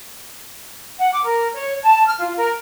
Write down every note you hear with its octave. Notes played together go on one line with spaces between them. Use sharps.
F#5
D6
A#4
C#5
A5
F6
F4
A#4